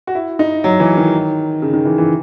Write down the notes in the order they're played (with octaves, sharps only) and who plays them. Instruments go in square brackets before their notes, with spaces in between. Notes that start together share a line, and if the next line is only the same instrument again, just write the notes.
[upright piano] F#4
E4
D#4
F#3
E3
D#3
C#3
D#3
E3
E3